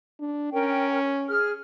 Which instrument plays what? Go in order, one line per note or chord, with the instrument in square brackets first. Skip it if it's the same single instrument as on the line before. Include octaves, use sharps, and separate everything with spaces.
[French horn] D4
[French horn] C#4 [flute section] A#4 G5
[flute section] G#4 F6